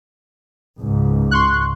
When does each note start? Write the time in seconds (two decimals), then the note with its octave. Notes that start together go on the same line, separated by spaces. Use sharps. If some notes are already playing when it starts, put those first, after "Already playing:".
0.78 C#2 G#2
1.31 C6 C#6 F#6